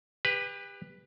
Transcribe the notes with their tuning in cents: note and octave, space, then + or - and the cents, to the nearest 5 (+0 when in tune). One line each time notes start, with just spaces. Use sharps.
G4 +35 B4 +0